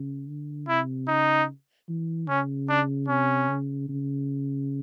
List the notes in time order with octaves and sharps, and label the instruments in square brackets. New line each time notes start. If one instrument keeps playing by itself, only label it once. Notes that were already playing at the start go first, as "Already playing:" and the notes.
Already playing: [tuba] C#3
D3
[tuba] C3 [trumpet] E4
[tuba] C#3 [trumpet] D#4
[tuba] E3
[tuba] C#3 [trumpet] C#4
[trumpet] D4
[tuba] C3 [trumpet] C#4
[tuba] C#3
C#3